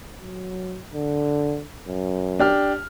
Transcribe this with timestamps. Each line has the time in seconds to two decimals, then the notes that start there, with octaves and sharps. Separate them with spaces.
0.20 F#3
0.93 D3
1.88 F#2
2.40 D4 G4 F6